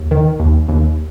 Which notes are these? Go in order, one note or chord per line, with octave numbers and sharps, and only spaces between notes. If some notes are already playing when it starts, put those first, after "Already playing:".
Already playing: D#2
D#3
D#2
D#2